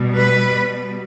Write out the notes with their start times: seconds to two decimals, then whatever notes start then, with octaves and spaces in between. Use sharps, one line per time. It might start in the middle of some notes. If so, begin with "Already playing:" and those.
Already playing: B2 G3
0.15 B4